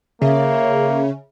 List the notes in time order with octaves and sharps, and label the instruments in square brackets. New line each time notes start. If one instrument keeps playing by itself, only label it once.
[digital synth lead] C#3 [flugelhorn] A#3 [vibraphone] E5